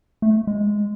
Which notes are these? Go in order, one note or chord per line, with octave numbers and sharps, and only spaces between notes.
A3
G#3